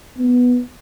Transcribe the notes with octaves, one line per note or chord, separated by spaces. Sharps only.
B3